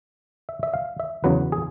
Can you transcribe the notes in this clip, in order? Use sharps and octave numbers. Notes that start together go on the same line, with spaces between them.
E5
E5
F5
E5
E2 C#3 F#3 B4
G#4